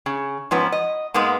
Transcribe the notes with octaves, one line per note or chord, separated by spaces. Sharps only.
C#3
G#2 F3 B3 C#4
D#5
G#2 G#3 A#3 B3